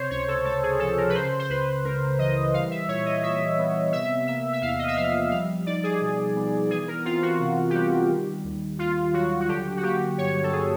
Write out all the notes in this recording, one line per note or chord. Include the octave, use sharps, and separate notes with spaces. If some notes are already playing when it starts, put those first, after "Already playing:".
Already playing: C3 C5 C#5
C#2 C#5
A4
C#2 A4
G#4
F3 A4
A#4
B4
C#3 C5
C5
C#2 B4
C#2 A#4
E3 D#5
G3 F5
E5
A#2 C#5
D#5
A#2 E5
B3
C3 E5
A#3 E5
E5
E2 F5
D#5
E5
F3 F5
G3 F5
D#4 D5
G#4
B2
B3
E3 G#4
A#4
C4 F4
F#4
C3
G4
G3 F#4
D#3
D#2
D#2 F4
F#3 F#4
F#4
D3 G4
F#4
A#3 G4
G2 C#5
A4
F#3 G#4